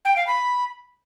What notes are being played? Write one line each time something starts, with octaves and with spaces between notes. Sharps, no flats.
G5
F5
B5